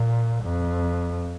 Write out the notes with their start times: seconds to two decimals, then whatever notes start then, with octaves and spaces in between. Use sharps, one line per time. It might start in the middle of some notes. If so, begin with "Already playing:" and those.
Already playing: A#2
0.43 F2